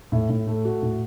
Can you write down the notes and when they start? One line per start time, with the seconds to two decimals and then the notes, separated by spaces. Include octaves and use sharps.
0.12 A2
0.29 A2
0.47 A3
0.65 F#4
0.82 A2